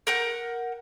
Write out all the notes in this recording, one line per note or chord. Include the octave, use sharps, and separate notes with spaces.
A#4 F#5 G6